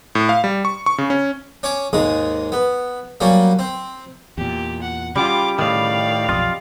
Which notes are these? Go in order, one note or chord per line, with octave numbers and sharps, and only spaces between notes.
A2
F5
G3
C#6
C#6
C#3
C#4
C#4 C#5 D6
D#2 G#2 G#3 D#6
B3
F#3 G3 A#3 C#4
C4
E2 A#2 G4
F#5
C#3 G3 F4 D6
A2 D#3 D5 F5
B1 F2 F4 D#5